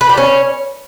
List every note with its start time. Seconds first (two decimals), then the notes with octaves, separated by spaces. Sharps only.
0.01 B4
0.09 G4
0.17 C#4